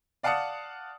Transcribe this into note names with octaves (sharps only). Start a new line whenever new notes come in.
D5 F5 F#5 A5 D#6 C#7